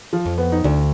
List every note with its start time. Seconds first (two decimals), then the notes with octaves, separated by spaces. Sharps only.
0.13 F3
0.26 F2
0.38 B3
0.52 D#4
0.64 D2 D4